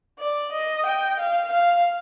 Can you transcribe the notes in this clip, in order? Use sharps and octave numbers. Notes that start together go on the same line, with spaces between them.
D5
D#5
G5
F5
F5